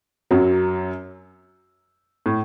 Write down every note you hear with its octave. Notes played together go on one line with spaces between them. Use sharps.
F#2 F#3
A2